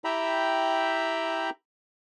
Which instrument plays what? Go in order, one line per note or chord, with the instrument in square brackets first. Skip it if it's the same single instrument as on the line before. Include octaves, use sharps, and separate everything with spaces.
[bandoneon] E4 G4 E5 G5 A#5 B5